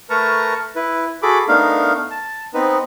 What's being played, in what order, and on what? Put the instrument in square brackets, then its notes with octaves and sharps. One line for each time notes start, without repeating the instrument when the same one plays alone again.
[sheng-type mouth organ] A3 A#4 B4 A5 A#5 C#6
E4 B4
F#4 G#4 A4 B5 D6
A3 B3 D4 D#4 A#4 F5
A5
B3 C4 D#4 B4